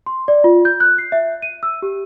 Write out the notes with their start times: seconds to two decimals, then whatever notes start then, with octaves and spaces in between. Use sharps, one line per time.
0.06 C6
0.28 D5
0.44 F4
0.65 G6
0.80 F#6
0.98 C7
1.12 E5
1.42 D#7
1.63 E6
1.82 G4